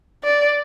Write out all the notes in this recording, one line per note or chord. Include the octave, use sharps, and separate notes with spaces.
D5